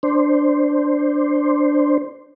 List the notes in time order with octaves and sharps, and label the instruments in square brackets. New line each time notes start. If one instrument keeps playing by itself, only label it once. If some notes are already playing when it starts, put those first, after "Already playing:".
[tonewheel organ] D4 C5